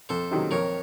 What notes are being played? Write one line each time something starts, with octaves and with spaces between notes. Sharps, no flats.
F2 A4 C5
C3 D#3 F#3
F2 A#4 C#5